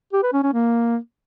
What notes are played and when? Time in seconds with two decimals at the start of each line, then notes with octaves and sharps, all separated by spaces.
0.13 G4
0.23 B4
0.33 C#4
0.43 C#4
0.53 A#3